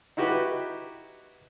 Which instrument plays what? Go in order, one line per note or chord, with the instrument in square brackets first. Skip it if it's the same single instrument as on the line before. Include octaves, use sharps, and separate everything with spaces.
[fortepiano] D#4 E4 F#4 G4 B4